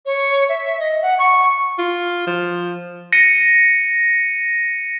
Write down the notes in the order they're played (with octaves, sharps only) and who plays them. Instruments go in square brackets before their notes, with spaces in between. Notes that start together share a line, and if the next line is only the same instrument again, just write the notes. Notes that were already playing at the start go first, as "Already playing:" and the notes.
[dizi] C#5
E5
D#5
F#5
C#6
[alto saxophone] F4
F3
[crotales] A#6 C#7 D#7